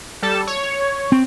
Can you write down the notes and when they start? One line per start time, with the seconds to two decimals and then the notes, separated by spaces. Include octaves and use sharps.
0.22 G3 A4 A5
0.47 C#5
1.12 C4